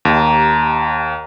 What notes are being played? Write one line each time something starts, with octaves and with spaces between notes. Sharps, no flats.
D#2 D#3 D#4 G4